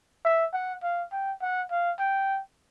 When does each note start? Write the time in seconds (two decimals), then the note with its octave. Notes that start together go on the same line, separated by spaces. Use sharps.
0.25 E5
0.53 F#5
0.83 F5
1.12 G5
1.42 F#5
1.70 F5
1.99 G5